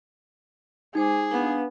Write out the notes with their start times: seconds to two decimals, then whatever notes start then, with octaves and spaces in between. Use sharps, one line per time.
0.95 G#3 D#4 G#4 C5 D6
1.31 B3 D4 B4 F5